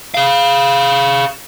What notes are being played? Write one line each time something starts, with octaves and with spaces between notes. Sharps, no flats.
G#4 F5